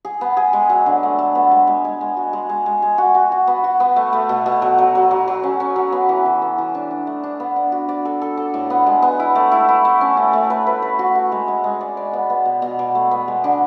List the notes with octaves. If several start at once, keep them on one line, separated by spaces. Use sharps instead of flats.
G#4
B3
G#4
G#3
F#3
D3
A3
A3
B3
G#3
G#3
G#3
G#3
F#4
G#3
G#3
G#3
G#3
F#4
F#4
F#4
B3
F#4
B3
A3
A3
B2
B2
F#3
F#3
F#3
F#3
F#3
C#4
C#4
F#3
B3
E3
E3
B3
E3
D4
D4
A3
D4
B3
D4
F#4
D5
A4
A4
A4
A2
B3
G#3
B3
E4
A3
E4
E4
A3
C#4
A3
A3
B4
B4
B4
F#4
F#4
G#3
G#3
G#3
D5
D5
B3
B3
B2
B2
B2
A3
B3
G#3
D3